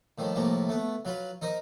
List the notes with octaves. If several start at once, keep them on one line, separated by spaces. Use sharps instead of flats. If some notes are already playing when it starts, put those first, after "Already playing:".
A2 D#3 F3 G3
A2 C3 F3 G3 A#3
A3 B3
F#3 F4 B4
D#4 A#4 C5 D#5